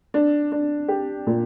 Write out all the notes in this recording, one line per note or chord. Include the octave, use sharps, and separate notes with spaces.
D4
D4
G4
A#2